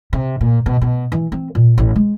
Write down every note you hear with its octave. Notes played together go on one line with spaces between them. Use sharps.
C3
A#2
B2
B2
E3
C4
A#2
A1
G#3